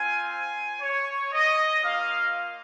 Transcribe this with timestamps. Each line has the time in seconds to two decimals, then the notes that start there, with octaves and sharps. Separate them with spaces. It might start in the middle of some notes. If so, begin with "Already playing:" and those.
Already playing: C4 F4 G#5
0.31 G#5
0.82 C#5
1.33 D#5
1.84 A#3 F4 F5